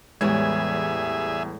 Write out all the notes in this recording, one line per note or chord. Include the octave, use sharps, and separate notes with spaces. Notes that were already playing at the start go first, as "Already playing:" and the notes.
E2 A2 E3 G3 G#3 G#4 E5 G#6